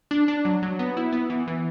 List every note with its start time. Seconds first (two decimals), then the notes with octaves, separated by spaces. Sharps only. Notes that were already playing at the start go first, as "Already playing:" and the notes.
0.11 D4
0.28 D4
0.45 F#3
0.62 F#3
0.79 B3
0.97 E4
1.13 B3
1.30 E3
1.47 E3